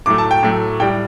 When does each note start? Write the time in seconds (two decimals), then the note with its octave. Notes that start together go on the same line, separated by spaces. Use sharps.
0.06 A2 F#3 A3 D6
0.18 A5
0.31 G5
0.43 A2 F#3 A3
0.80 A2 G3 G5